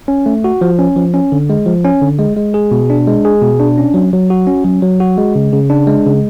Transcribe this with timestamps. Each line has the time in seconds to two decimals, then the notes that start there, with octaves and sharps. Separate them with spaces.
0.08 C#4
0.26 A3
0.44 F#4
0.61 F3
0.79 C#4
0.96 F3
1.14 C#4
1.32 D3
1.49 G#3
1.66 F3
1.85 C#4
2.02 D3
2.19 G#3
2.37 G#3
2.54 G#4
2.71 B2
2.90 D4
3.07 G#3
3.25 G#4
3.42 B2
3.60 D4
3.78 C#4
3.94 F#3
4.13 F#3
4.30 F#4
4.47 C#4
4.64 F#3
4.82 F#3
5.00 F#4
5.17 G#3
5.35 C#3
5.53 C#3
5.70 D4
5.87 G#3
6.06 C#3